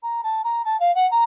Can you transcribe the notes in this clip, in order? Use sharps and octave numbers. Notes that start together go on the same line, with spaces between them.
A#5
A5
A#5
A5
F5
F#5
A#5